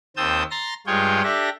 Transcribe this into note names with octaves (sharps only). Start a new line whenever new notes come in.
D#2 C4 A5 D#6 E6 G6
A#5 C6 A6 A#6
G2 G#3 F4 G#4 C#5 G5
D4 G4 A4 E5 A#6